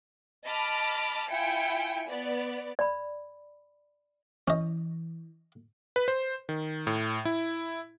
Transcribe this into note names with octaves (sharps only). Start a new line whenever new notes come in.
D#5 A5 B5 D6 F6
E4 F4 G5 G#5 C#7 D7
B3 D5
D5 B5
E3 C#4 D#5
B4
C5
D#3
A2
E4